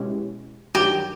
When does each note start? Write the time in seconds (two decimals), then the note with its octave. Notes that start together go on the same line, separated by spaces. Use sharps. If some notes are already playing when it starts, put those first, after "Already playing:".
Already playing: B2 G#3 C#4 E4 G4
0.75 G2 D#3 F#3 G4